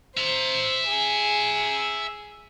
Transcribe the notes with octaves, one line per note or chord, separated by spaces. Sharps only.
C5 E5 A#5
G#4